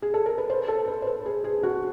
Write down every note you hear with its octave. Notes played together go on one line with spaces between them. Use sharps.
G#4
A4
A#4
B4
C5
A4
B4
C5
B4
G#4
G#4
F#4